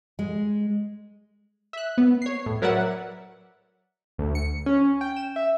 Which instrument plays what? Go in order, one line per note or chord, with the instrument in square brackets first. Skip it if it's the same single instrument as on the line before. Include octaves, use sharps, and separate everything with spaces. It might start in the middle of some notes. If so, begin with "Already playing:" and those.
[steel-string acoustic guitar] G#3
[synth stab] E5 F#6
B3
C#5 C7
A2
F#3 A#4 B4 D5 E5 F#5
[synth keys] D2
C#7
C#4
G5
E7
E5